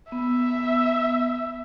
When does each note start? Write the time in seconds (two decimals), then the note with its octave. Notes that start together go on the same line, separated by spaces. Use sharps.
0.12 B3 E5